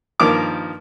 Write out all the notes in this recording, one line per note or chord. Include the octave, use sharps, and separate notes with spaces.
G2 D#3 F3 A#3 A#4 D6